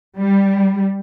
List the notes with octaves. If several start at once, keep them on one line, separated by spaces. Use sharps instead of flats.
G3